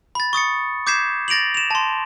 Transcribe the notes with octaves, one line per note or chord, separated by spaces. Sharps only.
B5 A6
C#6 D#6 A6 C#7
D6 G6 G#6 B6 C7 E7
A6 A#6 D7 F7 F#7
E7 F7
A5 C6